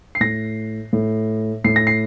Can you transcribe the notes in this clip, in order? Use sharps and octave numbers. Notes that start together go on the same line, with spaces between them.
C7
A2 A#6
A2
A2 C7
A#6
C7